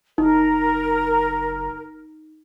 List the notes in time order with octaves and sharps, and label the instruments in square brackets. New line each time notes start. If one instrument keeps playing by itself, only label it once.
[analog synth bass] F#1 [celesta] D#4 [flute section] A#4